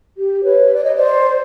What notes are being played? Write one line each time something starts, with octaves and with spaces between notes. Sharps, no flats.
G4
B4 C#5
D5
D#5
C5 D5